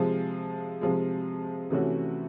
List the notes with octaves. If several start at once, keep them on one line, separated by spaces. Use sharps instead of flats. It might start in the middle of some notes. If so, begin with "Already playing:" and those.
Already playing: C3 F3 G#3
C3 F3 G#3
C3 E3 A3 C#4 F#4